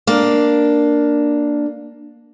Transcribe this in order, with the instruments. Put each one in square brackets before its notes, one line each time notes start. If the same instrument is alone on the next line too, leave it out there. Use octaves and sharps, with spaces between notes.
[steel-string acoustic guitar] A#3 D4